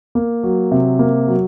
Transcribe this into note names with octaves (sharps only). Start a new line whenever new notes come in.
A#3
F#3
C3
A#3
F#3